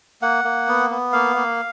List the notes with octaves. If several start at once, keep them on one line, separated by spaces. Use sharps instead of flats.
A#3 F#5
A#3
B3
B3
A#3 F5
A#3